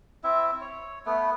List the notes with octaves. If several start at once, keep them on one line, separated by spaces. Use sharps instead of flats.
C4 E4 E5
C#5
A3 B3